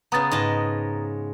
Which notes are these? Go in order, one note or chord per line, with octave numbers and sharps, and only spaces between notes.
C#3 B3 A#5 D#6 A6
G#2 D#5 A5